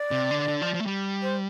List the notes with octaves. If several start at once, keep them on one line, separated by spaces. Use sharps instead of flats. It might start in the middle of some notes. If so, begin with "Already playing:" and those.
Already playing: D5
C3
D3
D3
F3
F3
A3
G3
C5